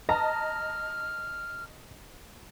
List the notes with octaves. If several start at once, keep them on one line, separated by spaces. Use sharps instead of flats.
D#5 A5 A#5 F6